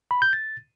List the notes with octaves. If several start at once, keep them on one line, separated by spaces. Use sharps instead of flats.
B5
G6
A6